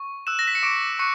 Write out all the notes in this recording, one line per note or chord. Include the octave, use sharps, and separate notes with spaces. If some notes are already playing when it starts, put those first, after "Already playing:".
Already playing: C#6
E6 F#6 E7
A#6
B6
C#7
C#6 D6 D7
C#6 F#6 C#7